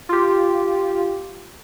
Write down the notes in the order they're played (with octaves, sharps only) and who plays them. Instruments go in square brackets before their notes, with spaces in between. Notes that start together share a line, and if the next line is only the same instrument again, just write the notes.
[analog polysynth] F4 G4